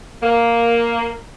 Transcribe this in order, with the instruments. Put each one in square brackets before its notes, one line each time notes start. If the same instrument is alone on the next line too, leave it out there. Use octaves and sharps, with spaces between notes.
[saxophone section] A#3